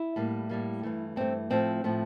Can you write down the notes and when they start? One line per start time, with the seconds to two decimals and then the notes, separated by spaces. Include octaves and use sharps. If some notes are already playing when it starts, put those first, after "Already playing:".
Already playing: E4
0.16 A2 G3 A#3
0.49 A2 G3 A#3
0.83 G2 E3 A3
1.16 G2 E3 A3 C4
1.50 A2 F3 A3 C4
1.84 A2 F3 A3